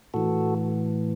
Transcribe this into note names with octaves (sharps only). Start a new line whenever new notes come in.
A2 E3 F#4 A4